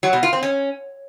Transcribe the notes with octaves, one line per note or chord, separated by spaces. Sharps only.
F#3
B2
F4
C4
C#4